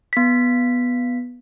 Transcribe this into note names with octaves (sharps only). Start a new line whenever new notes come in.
B3 B6